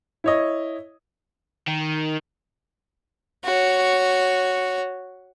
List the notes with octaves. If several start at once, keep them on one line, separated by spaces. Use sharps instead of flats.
E4 C#5 D#5
D#3
F#4 C#5